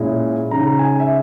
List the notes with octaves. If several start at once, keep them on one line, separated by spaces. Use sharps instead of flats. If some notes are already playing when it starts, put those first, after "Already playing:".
Already playing: A#2 G#3 C#4 E4
C#3 G#3 D#4 A#5
G#5
E5